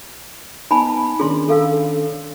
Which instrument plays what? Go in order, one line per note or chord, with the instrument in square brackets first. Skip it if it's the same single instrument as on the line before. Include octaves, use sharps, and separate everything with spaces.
[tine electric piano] B3 D#4 [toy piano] G#5 A5 B5
[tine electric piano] D#3 C#4 D4 [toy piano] G#4 C6
[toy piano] A4 F5 E6